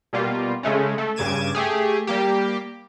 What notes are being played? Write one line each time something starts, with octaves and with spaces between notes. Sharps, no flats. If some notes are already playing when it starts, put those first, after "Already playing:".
B2 G3 A#3 F4
C#3 G#3 A3 C#4
A3
G2 C#3 D6 G#6 D#7 E7
A3 G4 G#4
G3 A#3 G4